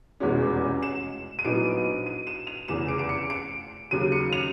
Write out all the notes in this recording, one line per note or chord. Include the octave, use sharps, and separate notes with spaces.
F1 E2 B2 G#3 C#4
E7
D#7
A#1 A2 F#3 B3 D#4 D7
D#7
E7
F7
F1 E2 C#3 E7
D7
D7
C#7
D7
D#2 C#3 F#3 D#7
C#7
F7